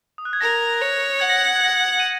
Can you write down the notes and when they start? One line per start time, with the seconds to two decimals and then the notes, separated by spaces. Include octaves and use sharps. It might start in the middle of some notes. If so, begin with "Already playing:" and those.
0.18 D#6
0.25 F#6
0.33 G#6
0.40 A#4 A#6
0.81 C#5
1.20 F#5 G#6
1.30 A#6
1.39 G#6
1.47 A#6
1.56 G#6
1.64 A#6
1.74 G#6
1.89 F#7
2.00 D#7